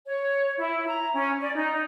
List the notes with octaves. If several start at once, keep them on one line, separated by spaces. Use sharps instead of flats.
C#5
E4
A#5
C#4
D5
D#4